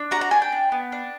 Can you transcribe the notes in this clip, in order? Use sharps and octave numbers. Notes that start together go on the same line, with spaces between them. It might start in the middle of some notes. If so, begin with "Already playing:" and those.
Already playing: D4
F#4 A#5
A#5
D4 G#5
G5
D4
B3
D4